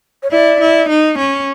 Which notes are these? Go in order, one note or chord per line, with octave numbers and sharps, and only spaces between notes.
C#5
E4 D5
E4
D#4
C#4